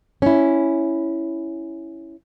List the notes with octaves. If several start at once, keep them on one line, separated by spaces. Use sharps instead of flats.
C#4 E4